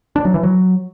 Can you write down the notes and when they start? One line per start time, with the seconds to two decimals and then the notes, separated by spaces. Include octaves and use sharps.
0.16 D4
0.25 F#3
0.34 E3
0.43 F#3